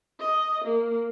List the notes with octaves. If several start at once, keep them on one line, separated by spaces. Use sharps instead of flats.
D#5
A#3